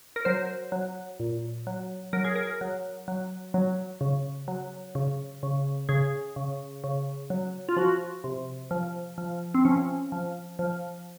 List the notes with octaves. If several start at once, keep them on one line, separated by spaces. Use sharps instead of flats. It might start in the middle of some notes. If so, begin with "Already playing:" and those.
A#4
F#3 C5
F#3
A#2
F#3
F#3 A#4
G#4
A#4
F#3
F#3
F#3
C#3
F#3
C#3
C#3
C#3 G#4
C#3
C#3
F#3
F4
F3 F#4
C3
F3
F3
C4
F3 C#4
F3
F3